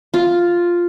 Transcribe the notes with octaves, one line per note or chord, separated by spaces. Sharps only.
F4